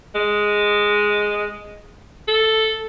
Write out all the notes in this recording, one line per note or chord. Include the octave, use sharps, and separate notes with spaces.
G#3
A4